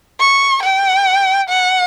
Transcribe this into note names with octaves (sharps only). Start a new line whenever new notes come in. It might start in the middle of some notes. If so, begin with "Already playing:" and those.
C#6
G5
F#5